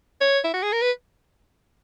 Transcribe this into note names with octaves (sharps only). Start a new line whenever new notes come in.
C#5
E4
F#4
G#4
A#4
B4